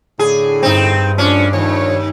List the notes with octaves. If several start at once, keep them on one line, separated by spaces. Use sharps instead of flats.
A2 D3 G#4
G2 C4 D#4
F3 A3 C#4 D4
D#2 F3 D4 C#5